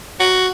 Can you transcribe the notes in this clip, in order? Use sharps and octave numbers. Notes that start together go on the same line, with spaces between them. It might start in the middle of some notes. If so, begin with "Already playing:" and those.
F#4